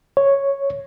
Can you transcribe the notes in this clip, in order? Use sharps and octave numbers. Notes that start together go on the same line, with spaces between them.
C#5